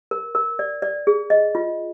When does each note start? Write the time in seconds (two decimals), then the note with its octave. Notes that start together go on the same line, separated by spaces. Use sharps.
0.11 A#4
0.35 A#4
0.59 D5
0.82 D5
1.07 G#4
1.30 D#5
1.55 F4